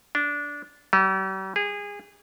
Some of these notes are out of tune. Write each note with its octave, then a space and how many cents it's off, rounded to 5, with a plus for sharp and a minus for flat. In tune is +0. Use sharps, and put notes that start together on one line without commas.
D4 -15
G3 -45
G#4 -25